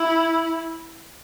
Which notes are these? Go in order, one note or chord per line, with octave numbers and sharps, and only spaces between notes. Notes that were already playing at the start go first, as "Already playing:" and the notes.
Already playing: E4